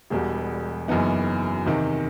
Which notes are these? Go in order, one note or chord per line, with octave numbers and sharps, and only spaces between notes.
E1 E2 B2 G3
F#1 F#2 E3 B3 D#4
E2 C3 D#3